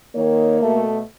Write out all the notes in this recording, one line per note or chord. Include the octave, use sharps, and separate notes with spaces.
D#3 A#3 C#5
B2 A3